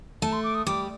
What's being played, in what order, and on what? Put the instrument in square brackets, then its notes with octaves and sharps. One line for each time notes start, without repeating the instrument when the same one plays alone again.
[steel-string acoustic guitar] A3 [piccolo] A5
[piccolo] C6
D6
D#6
[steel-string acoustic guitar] G3 [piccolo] D6